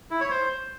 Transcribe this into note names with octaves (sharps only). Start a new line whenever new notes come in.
E4
C#5
C5